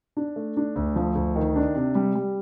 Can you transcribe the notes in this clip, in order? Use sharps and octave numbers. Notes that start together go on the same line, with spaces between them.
D4
A3
D4
D2
F3
D2
D#3
D4
C3
G3
G3